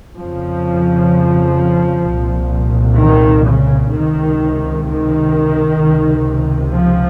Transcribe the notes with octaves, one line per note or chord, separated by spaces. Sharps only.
F2 C#3 F3
C2 A#2
D#3
C#3
C#2 C3 D#3
D#3
C#2 C3
F3